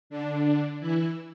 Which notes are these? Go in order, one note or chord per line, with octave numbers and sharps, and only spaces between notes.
D3 D4
E3 E4